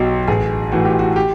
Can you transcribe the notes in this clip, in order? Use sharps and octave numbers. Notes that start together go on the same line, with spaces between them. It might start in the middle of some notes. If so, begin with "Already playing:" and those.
Already playing: B1 B2 F#3 G4
A1 G#4
A2 E3 F#4
G4
F#4
G4